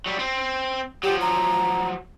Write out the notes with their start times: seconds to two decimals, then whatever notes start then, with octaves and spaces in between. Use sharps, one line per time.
0.06 F#3 G3
0.19 C4
1.03 F3 F#3 G4
1.21 A#5